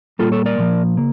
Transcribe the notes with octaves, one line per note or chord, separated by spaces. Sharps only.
A#2 G3 A#3 F4 A4
A4 C#5
A#4 D5
A#2 F3 A#3
C#3 A#3